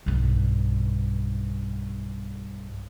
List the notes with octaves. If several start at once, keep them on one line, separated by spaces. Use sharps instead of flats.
B1 G2